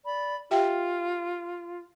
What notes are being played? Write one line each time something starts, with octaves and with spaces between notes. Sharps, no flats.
D5 B5
F4 G4 E5 G5